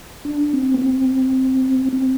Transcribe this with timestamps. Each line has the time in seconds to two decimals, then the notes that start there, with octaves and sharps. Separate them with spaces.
0.25 D4
0.53 C4
0.74 B3
0.81 C4
1.93 C4